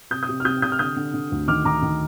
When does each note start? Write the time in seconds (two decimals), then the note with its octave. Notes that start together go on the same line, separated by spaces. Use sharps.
0.10 C3 D#6 G6
0.23 D#6 G6
0.29 C3
0.40 F6
0.45 C3 D#6 G6
0.62 C3 D#6 G6
0.72 F6
0.79 D3 D#6 G6
0.97 D3
1.14 D3
1.32 D2
1.48 D#3 D6 F6
1.65 D#3 A#5 D6
1.82 D#3